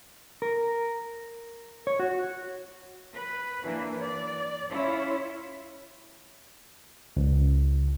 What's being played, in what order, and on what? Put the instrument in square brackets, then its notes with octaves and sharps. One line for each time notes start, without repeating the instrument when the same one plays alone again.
[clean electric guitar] A#4
C#5
F#4
[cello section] B4
E3 A#3 D4
D5
C#4 E4 F4 C#5
[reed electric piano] C#2